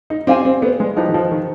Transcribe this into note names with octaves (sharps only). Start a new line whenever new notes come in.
D#4
C4 G4 D5 F5 G#5
C4
B3
G#3
F3 D#4 G4 B4
D#3
F3
D#3